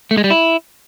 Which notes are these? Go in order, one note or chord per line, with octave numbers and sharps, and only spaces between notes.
A3
G#3
G3
E4